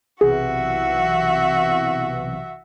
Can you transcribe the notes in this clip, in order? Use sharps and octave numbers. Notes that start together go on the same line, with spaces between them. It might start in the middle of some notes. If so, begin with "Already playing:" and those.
B1 C3 E3 F#4 G#4 E5